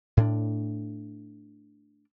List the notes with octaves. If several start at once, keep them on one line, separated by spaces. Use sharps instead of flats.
A2 D4